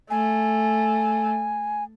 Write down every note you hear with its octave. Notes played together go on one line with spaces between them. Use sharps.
A3 G#5